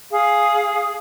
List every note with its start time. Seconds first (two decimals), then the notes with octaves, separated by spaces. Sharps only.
0.11 G#4 F5 D#6